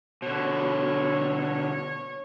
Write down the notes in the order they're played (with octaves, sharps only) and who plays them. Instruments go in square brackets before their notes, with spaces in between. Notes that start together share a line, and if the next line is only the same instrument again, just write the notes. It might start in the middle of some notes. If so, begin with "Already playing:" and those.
[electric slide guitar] B2 D3 [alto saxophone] C#5